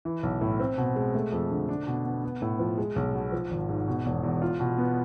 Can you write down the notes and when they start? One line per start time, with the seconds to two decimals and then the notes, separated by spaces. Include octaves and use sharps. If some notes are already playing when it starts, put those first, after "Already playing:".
0.05 E3
0.23 B1
0.41 A2
0.60 C4
0.78 B2
0.96 G#3
1.15 A3
1.32 F2
1.51 D3
1.69 D4
1.87 B2
2.05 B3
2.23 B3
2.42 A2
2.59 F3
2.78 G#3
2.96 B1
3.15 B2
3.32 F3
3.51 G#1
3.69 G#2
3.87 B2
4.06 E1
4.23 E2
4.42 F4
4.60 B2
4.78 B3